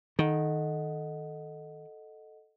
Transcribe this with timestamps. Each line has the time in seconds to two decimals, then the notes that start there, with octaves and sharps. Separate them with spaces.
0.19 D#3 A4 D#5 F#5